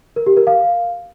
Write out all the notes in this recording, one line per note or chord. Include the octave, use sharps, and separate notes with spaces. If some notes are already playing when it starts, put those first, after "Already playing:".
A#4
G4
A#4
F5